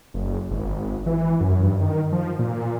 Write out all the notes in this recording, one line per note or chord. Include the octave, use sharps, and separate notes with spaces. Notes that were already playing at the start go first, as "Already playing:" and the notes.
F#1
G#1
E3
F#2
G2
D#3
F3
A#2